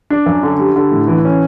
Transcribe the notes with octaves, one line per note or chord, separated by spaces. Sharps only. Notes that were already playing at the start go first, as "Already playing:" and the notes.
D4
F#2
D3
G3
D3
A2
E3
C#4